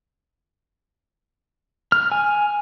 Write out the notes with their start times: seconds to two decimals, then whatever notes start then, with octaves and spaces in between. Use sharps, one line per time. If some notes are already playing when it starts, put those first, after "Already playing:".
1.92 F6
2.12 G#5